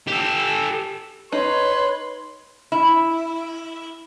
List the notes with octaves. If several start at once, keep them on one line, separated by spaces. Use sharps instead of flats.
G4 A4
D#4 B4 C#5 C6
E4